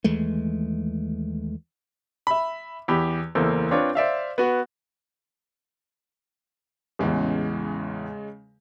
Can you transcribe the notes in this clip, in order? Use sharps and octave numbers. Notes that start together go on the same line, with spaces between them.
D#2 E3 G#3 A3
E5 B5
E2 G4 B5
F#1 E2 A#3 A4 C5
C4 D4 F4 B4 C#5
C5 D5 E5 F5
B3 F#4
A1 E2 C#3 G#3